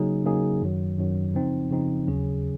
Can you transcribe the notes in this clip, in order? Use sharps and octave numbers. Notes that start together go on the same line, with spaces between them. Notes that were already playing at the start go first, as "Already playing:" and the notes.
Already playing: C#3 F#3 A#3 D#4 G#4
C#3 F#3 A#3 D#4 G#4
F#2 D#3 F#3
F#2 D#3 F#3
C#3 F3 C4 D#4
C#3 F3 C4 D#4
D#2 C#3 F#3 C#4 G#4